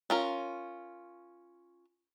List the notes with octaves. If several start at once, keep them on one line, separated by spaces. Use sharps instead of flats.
C#4 F4 A#4